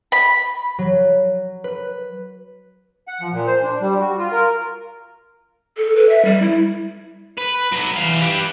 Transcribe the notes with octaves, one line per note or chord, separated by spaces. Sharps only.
B5
F#3
B4
F#5
F3
A#2
C5
D4
G3
F#4
F4
A#4
A4
B4
E5
G3
E4
B4
F#3 B4
E3 F5
G4 B4